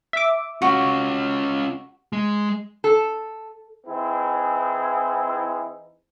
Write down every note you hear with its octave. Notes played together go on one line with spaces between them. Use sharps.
E5 D6
C#4 F4 F#4
G#3
A4
E3 C4 D#4 E4 G#4